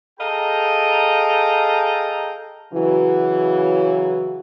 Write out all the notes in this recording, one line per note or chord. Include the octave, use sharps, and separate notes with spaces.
G#4 A4 D#5 F5 G5 A#5
C#3 E3 F#3